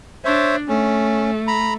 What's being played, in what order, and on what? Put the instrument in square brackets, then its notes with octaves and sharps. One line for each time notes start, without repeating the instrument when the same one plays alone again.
[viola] D4 [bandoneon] C5 C#5 E5
[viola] A3 [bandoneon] C#4
[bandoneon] A#5 B5